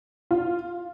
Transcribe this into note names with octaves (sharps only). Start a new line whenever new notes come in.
F4